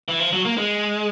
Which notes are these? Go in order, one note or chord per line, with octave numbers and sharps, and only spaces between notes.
E3
F3
F#3
A#3
G#3